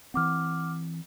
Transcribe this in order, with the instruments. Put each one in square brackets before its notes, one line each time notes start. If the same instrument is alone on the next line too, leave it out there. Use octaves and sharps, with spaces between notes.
[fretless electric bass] E3 C4 [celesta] F#5 D6 F6